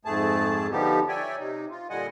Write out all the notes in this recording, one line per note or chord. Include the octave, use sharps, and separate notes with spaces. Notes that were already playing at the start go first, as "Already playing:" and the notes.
F2 G#2 A3 G#4 A5
D3 F3 G3 B3 D#4 G4
C#5 D5 E5 G5 G#5
C3 D#4
F4
A#2 D3 G3 D#5 F#5 G#5